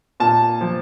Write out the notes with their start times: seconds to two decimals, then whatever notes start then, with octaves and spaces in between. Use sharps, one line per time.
0.20 A#2 A5
0.61 F3